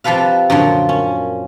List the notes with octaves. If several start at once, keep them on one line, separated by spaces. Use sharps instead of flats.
C3 F3 G4 A4 B4 F5
F#2 A#2 D3 F3
C#4